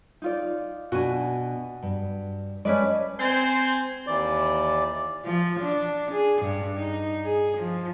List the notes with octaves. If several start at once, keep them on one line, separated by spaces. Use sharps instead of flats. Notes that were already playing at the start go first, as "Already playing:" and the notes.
D#4 F4 D5
B2 D4 F#4 G#5
G2
G#3 C#4 B4 D5 E5 A5
C4 C5 G#5
D#2 E3 D5
F3
D4
G#4
G2
D#4
G#4
F3